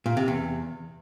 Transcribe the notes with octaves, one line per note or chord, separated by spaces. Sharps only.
A#2
C3
E2